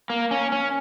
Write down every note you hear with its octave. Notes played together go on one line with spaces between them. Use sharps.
A#3
C#4
C#4